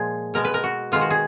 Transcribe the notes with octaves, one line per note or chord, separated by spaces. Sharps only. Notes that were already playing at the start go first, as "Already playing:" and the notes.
Already playing: A#2 F3 G#3 G#4
B2 G#3 B3 A#4
B4
A#4
F#4
D#3 G#3 B3 F4
F#4
G#4